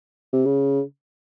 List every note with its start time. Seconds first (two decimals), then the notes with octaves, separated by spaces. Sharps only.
0.33 C3
0.45 C#3